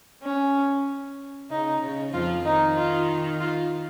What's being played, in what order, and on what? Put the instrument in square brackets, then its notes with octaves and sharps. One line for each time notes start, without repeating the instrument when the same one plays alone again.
[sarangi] C#4
[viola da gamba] C#3 [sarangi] D#4
[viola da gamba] C#3
[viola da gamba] F2 F3 [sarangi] F4
[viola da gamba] D#3 [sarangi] D#4
[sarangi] F4
F4